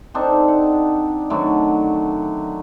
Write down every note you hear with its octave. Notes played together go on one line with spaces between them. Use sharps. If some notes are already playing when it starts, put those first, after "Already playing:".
C4 D4 D#4 A4
F#5
D3 D#3 F#3 A3